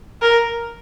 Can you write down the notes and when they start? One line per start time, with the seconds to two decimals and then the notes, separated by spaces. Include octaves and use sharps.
0.22 A#4